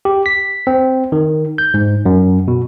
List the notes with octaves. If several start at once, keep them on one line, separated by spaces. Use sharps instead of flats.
G4
B6
C4
D#3
G6
G#2
F#2
B2